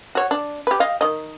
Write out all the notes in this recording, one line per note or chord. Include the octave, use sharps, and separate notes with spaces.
F#4 C#5
D4
G4 B4
D#5 F5
D#3 D#5